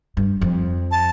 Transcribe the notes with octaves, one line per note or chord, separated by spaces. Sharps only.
G2
F2
A5